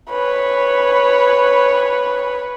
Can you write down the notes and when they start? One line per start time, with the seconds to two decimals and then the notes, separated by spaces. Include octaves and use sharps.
0.10 B4 C#5